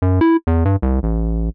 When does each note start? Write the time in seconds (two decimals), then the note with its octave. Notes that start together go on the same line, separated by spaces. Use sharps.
0.02 F#2
0.21 E4
0.47 E2
0.65 G2
0.82 C2
1.03 A1